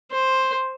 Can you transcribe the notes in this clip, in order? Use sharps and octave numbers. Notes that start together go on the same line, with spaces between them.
C5